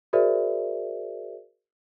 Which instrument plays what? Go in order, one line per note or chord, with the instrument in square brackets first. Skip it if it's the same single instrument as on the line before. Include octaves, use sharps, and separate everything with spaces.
[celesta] F#4 G#4 A#4 C5 D5 E5